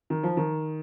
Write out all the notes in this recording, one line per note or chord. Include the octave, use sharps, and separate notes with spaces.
D#3
F3
D#3